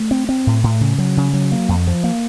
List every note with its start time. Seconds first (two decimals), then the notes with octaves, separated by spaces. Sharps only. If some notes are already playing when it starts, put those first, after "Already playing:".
Already playing: A3
0.11 C4
0.29 C4
0.47 A2
0.64 A2
0.81 C#3
0.98 F#3
1.17 C#3
1.33 F#3
1.52 A#3
1.69 F2
1.87 F3
2.04 A#3